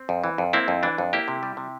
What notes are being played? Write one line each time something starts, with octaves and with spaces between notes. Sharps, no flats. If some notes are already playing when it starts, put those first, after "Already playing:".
Already playing: C4
F2
E3
F2
A#3 C4 E4
F2
E3 D4
F2
A#3 E4 G4
C3
G3
C3